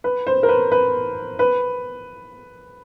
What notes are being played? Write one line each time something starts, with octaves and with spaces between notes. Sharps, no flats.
B4
C5
A#4
B4
B4
B4